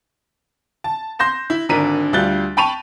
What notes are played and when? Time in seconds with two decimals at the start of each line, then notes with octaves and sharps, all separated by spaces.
0.84 A5
1.19 C6 G6 A#6 E7
1.50 E4
1.69 G#1 D3 D4 A#4 B6 D#7
2.13 D2 G3 F4 F#6 A6 G7
2.57 G5 A5 B5 C#6 D#7 F7